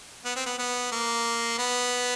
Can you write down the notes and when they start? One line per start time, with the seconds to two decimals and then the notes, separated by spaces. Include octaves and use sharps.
0.25 B3
0.36 C4
0.46 B3
0.59 B3
0.92 A#3
1.58 B3